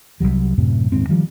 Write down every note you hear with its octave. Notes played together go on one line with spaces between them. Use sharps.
C2 F#2 F#3 G3
F#2 A2 C3
D#1 D#2 G#2 C4
D#3 F3 G3